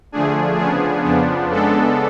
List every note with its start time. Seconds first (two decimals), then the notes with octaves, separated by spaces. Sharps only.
0.12 D3 F3 A3 D4 G#4
0.59 C#3 F3 B3 D4 G#4
1.05 F2 C#3 F3 B3 D4
1.51 C#3 G#3 B3 D4 A4